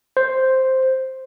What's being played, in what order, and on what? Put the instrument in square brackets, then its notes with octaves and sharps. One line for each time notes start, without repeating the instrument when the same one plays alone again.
[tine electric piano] C5